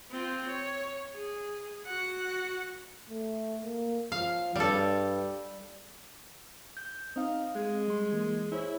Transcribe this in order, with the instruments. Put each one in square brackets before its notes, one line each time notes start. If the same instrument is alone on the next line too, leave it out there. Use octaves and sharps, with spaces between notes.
[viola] C4 F4
C#5
G#4
F#4 F#5
[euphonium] A3
A#3
[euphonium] F3 [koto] F5
[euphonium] G2 [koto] G3 A4
[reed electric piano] G6
[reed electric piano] C4 F5 [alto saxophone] D#4
[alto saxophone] G#3
[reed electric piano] G3 C6
E3 A#3
[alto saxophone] E4 [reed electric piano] G#4 C5 C#5